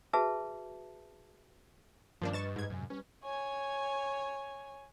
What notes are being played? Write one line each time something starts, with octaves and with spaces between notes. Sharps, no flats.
F#4 G#4 B4 E5 A5
G2 D#3 F3 A#3 C#4 D4 F4
B4 D#5 C#6 A6 E7
G#2 G#6
F#2 A2 C3 G#5
G3 C#4 B4
C#5 G#5